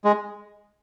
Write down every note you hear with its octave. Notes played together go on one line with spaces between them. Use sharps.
G#3